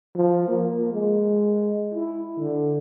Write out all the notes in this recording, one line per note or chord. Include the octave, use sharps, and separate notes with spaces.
F3
A#3
G#3
E4
D3